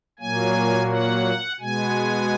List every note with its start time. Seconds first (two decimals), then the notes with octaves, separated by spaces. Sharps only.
0.19 A#2 F#3 A#3 G#5
0.89 F#5
1.60 B2 G#3 B3 G#5